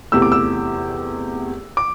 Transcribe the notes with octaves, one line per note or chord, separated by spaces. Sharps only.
E2 C3 A3 E4 G4 E6
D6
E6
D6